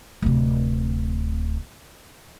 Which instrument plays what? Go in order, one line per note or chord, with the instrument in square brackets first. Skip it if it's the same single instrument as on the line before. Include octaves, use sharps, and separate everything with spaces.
[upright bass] D1 C3